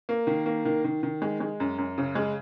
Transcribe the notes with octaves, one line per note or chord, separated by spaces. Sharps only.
A#3
D#3
A#3
D#3
D#3
D#3
G#3
G#3
F#2
F#2
C#3
G#3